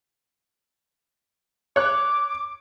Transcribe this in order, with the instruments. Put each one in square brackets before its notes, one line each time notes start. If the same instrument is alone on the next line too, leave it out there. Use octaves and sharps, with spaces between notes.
[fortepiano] C#5 F#6 [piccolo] D6